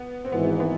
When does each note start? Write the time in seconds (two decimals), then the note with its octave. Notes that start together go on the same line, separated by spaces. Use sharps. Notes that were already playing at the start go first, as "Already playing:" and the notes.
Already playing: B3
0.25 C4
0.32 G#1 G#2 E3 B3
0.60 B3